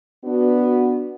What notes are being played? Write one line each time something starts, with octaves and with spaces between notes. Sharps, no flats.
B3 D4 F#4